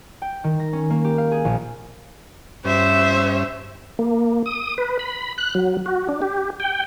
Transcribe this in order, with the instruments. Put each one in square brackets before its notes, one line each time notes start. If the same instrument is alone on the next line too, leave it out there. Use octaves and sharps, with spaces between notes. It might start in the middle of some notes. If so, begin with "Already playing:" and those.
[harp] G5
D#3
A#6
C#4
A#3
G4
F5
G#4
A#1
[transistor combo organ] G2 C#4 [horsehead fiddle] C5 E5
[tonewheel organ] A#3
D#6
B4
B5
F#6
F#3
F#4
D4
G4
G5